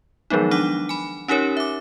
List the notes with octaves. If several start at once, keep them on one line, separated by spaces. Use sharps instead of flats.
D#3 F3 F#3 G#3 B3 D#4
D4 F#5 D6
G#5 B5
C#4 D#4 G4 A#4 C#5
E5 D6